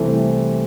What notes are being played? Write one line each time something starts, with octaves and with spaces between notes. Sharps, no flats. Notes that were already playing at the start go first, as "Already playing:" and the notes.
Already playing: C2 C3 E3 A3 C4